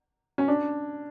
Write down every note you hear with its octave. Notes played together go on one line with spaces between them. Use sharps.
C#4
D4